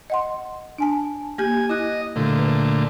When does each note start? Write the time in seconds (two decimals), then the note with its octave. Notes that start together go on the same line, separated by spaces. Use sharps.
0.10 D#5 F#5 C6
0.78 D4 G#5 A5
1.38 A#3 G4 G#5 G6
1.69 E4 D#5 F#6
2.16 A#2 D3 A3
2.39 B4